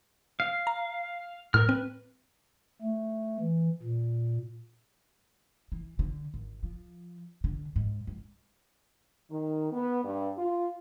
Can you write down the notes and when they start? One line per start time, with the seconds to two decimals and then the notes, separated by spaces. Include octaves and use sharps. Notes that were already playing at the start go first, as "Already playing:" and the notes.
0.40 F5
0.67 A#5
1.54 A2 A#4 F6
1.69 C4 B4
2.82 A3
3.40 E3
3.83 A#2
5.72 E3
5.99 D3
6.34 G#1
6.63 F3
7.44 D3
7.76 G#2
8.07 G#2
9.30 D#3
9.72 B3
10.04 G2
10.38 F4